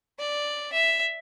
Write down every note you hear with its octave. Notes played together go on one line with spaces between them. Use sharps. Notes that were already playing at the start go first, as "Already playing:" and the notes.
D5
E5